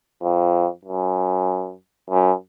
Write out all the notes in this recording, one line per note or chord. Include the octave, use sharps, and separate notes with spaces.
F2
F#2
F#2